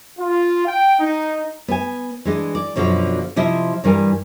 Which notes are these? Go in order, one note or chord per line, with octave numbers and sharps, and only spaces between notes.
F4
G5
D#4
B3 G#5
E3 G#3 D4
D5
F#2 B2 D3 F3
C3 F3 E4 D#5
G2 E3 G3 A#4 G#5